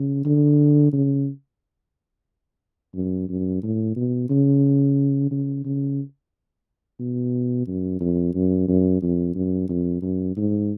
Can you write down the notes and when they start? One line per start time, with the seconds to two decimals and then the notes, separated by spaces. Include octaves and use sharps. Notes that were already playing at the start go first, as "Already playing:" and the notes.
Already playing: C#3
0.25 D3
0.93 C#3
2.95 F#2
3.29 F#2
3.63 A2
3.96 B2
4.30 C#3
5.31 C#3
5.65 C#3
7.00 B2
7.67 F#2
8.00 F2
8.34 F#2
8.68 F#2
9.02 F2
9.35 F#2
9.69 F2
10.02 F#2
10.37 G#2